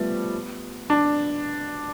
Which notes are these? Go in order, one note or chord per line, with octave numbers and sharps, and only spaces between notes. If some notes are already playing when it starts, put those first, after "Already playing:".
Already playing: F3 G3 A3 B3
D4